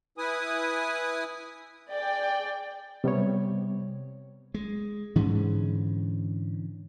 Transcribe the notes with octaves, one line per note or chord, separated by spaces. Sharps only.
E4 B4 G#5 D#6
G#4 D5 G5
C3 G3 B3 C#5
G#3
G#2 D3 E3 C#4